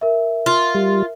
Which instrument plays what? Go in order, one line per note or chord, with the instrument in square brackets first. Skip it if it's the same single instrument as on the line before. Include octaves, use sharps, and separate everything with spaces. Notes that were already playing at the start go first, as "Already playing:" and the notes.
[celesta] A#4 E5
[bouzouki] F4
[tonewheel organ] G3